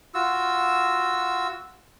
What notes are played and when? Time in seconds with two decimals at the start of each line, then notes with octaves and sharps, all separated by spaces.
0.14 F4 F#4 E6